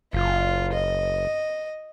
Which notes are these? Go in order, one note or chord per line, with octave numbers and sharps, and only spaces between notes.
F#1 F4
D#5